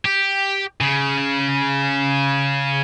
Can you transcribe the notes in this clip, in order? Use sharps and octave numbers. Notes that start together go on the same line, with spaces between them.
G4
C#3